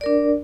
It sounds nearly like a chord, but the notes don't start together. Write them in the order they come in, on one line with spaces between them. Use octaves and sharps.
D5 A#4 D4